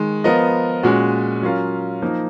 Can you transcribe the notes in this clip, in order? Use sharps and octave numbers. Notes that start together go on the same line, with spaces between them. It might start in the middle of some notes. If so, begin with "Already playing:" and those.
Already playing: D#3 G#3
F3 B3 F4 A#4 D#5
A#2 G#3 C#4 F#4
F#3 C#4 F4 A#4 F5
F3 A#3 D#4 A#4